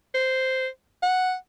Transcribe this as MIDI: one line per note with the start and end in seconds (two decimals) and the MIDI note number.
0.14 0.67 72
1.02 1.34 78